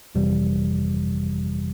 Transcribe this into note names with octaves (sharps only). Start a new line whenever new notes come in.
G1 F2 C3 E3 G3